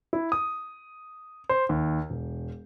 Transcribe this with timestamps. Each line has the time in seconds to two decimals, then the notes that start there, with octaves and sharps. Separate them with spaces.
0.13 E4
0.32 D#6
1.49 C5
1.69 D#2
2.10 E1